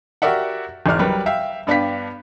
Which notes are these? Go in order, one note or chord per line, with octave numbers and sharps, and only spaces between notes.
F#4 G4 A#4 D5 E5 F#5
G#1 E2 D5 F6
F#3 G3 A#4 B4
E5 F5 G5
G2 B3 D4 F5 G5 B6